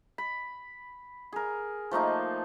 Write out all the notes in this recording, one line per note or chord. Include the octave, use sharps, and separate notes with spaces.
B5
G#4 A#4
F3 A3 A#3 D#4